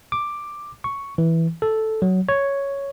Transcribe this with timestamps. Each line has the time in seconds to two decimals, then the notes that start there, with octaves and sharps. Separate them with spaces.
0.12 D6
0.84 C#6
1.18 E3
1.62 A4
2.02 F#3
2.29 C#5